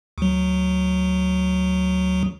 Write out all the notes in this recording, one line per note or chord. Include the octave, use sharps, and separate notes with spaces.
D2 F#3